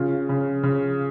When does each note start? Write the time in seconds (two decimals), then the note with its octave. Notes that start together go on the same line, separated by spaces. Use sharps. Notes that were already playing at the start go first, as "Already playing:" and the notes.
Already playing: C#3 F4
0.29 C#3
0.63 C#3